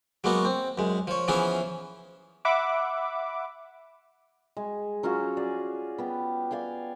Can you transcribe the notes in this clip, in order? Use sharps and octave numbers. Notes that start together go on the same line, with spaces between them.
F#3 G#3 A#3 B3 F#4
C4
F#2 G#3
F3 C#5
E3 F3 B3 C#4 E4 G#4
E5 F#5 B5 D6
G#3
F#3 C#4 F4 F#4
G#4 D5
B3 G4
D5 F5 G5 G#5